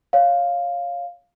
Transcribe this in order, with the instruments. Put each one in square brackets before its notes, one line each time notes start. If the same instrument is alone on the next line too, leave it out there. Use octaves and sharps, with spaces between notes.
[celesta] C#5 F5